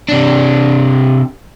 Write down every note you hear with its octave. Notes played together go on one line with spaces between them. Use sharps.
C3 D4